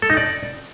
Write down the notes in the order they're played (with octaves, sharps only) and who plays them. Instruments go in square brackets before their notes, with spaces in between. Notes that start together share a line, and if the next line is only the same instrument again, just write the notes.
[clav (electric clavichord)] A4
D#4
D5